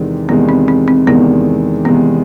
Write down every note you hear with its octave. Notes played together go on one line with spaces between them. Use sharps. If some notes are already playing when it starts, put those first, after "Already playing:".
Already playing: E2 C3 D#3 G#3
E2 C3 D#3 G#3 B3
C4
C4
C4
E2 C3 D#3 G#3 B3
E2 C3 D#3 G#3 B3